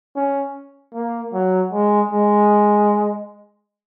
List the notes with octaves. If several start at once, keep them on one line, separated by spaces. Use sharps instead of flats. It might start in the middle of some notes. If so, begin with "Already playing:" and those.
C#4
A#3
F#3
G#3
G#3